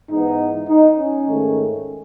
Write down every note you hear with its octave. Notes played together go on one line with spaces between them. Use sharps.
G#2 E3 B3 D#4
D#4
C#4
G#2 D#3 A3